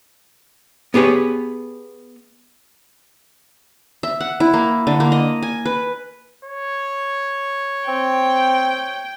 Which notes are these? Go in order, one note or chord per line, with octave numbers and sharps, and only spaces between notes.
B3 G4 G#4 B4 C#5
E5
F#5
E4
A#3
D3
A#3
D#5
G#5
B4
C#5
C4 G5